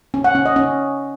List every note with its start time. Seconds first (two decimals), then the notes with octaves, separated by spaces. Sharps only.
0.14 C#4
0.24 F#5
0.35 C#4
0.46 D#5
0.56 C#4